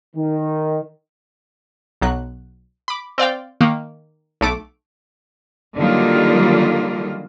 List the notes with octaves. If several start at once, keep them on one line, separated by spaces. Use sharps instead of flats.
D#3
B1 F#3 F#6
B5 D6
C4 D5 F5 G5
D#3 A#3
B1 A3 D6 D7
D3 D#3 F#3 G3 A#3 F4